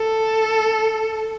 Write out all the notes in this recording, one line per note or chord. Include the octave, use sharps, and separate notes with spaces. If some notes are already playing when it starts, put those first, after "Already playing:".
Already playing: A4